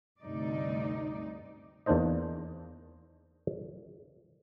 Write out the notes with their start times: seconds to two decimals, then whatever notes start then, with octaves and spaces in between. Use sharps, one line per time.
0.21 D2 G2 C3 D#4 D5
1.86 E2 A#3 D4 D#4 C5 D#5